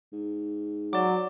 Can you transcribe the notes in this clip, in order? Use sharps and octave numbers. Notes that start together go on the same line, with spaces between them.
G#2
F#3 D5 D6